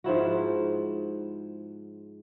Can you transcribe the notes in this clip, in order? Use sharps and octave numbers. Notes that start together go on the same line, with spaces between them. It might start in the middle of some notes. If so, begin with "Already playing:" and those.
G#2 F3 E4 F#4